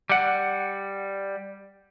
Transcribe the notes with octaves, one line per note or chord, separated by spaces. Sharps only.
G3 F#5